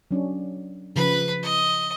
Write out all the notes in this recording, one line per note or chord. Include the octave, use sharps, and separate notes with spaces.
F#3 C#4 D4
C#3 F3 B4 B5
D#5